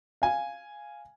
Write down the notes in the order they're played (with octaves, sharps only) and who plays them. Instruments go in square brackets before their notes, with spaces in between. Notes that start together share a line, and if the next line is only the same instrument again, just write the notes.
[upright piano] F5 G#5